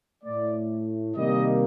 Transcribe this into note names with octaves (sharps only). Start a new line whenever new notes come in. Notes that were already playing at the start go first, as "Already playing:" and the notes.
A2 A3 D5
C3 D#3 G3 A#3 D#5